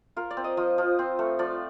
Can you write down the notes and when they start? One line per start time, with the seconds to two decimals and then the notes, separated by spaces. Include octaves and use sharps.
0.16 F4 A#4
0.30 D5
0.37 C4
0.44 D#5
0.57 F3 D#5
0.78 F3
0.99 C4
1.19 A3
1.39 F3 D5